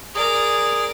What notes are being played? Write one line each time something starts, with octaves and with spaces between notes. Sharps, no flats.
G#4 A#4 D5